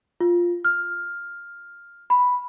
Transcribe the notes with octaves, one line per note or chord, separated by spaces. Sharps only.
F4
F6
B5